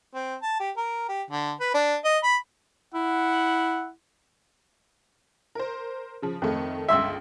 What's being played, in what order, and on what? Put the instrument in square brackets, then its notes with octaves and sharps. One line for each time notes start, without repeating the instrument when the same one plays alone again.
[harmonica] C4
A5
G4
A#4
G4
D3
B4
D4
D#5
B5
[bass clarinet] E4 [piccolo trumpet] F#5
[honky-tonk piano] A#4 C5
C#3 F3
[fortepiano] F2 [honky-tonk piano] D#3 A3
[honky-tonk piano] G1 C#2 [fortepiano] E5 C6 E6